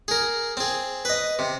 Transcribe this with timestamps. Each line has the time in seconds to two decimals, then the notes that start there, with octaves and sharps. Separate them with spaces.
0.08 G#4 A#4
0.57 C4 G#4
1.05 B4 D#5
1.39 C3